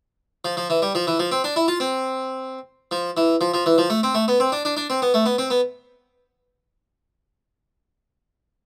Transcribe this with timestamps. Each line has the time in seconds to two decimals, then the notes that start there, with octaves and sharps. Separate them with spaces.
0.45 F3
0.57 F3
0.70 E3
0.82 G3
0.95 F3
1.07 E3
1.19 F3
1.32 C4
1.44 D4
1.56 E4
1.68 F4
1.80 C4
2.91 F3
3.17 E3
3.41 F3
3.54 F3
3.66 E3
3.78 F3
3.90 A3
4.03 C4
4.15 A3
4.28 B3
4.40 C4
4.52 D4
4.65 D4
4.77 D4
4.90 C4
5.02 B3
5.14 A3
5.26 B3
5.38 C4
5.50 B3